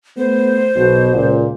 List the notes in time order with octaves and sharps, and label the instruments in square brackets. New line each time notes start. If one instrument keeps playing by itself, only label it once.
[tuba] A3 [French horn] B3 [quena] C5
[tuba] B1 [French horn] B2
[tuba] C#2 [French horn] A#2